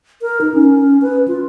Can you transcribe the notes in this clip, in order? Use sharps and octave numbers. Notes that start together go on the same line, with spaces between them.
A#4
D#4
C#4
B4
F4